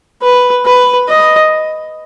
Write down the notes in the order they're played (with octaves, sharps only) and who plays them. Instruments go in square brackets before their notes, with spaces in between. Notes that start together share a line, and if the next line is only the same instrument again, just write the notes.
[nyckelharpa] B4
B4
D#5